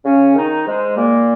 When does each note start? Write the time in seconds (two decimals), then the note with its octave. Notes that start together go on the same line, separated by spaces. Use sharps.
0.05 C#3 C#4
0.35 D#3 D#4
0.66 G#2 G#3
0.97 A#2 A#3